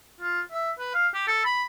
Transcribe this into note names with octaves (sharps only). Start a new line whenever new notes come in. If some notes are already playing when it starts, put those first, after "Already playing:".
F4
E5
B4
F5
G4
A4
B5